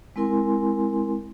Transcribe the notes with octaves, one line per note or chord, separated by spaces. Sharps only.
G#3 C4 E4 A#4 G#5 C6